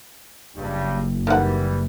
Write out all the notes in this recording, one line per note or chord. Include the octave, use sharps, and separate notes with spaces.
F#1 C#2 G2
D#3 E3 G3 F#5